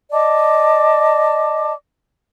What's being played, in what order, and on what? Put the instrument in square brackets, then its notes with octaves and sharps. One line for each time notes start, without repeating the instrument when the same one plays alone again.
[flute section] D5 D#5 A5 D6